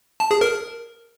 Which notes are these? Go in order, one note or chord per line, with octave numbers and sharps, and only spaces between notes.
A5
G#4
A#4